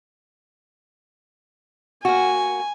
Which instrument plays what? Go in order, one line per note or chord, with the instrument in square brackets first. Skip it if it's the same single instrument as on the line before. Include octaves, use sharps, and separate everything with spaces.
[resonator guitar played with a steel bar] A#3 F#4 [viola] G#5